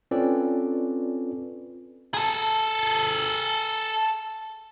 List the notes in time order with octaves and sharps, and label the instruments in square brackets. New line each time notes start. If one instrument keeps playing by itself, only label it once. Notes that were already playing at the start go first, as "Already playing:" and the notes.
[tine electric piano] C4 C#4 F4 A4 B4 D5
[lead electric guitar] G#4 A4